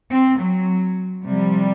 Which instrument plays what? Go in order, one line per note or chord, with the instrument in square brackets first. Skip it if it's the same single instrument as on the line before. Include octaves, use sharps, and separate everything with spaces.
[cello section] C4
F#3
C3 F3 G3